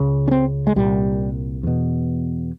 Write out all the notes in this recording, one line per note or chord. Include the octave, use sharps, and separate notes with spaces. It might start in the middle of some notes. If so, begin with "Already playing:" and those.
Already playing: C#2 C#3
C#4
C4
G#3
C2 A#2 G3
E2 B2